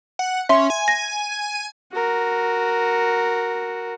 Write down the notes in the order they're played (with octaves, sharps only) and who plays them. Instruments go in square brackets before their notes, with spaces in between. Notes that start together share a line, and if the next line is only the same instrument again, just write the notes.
[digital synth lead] F#5
[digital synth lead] C#4 [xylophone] E5 C6
[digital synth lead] G#5
[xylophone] A#6
[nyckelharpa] F#4 A#4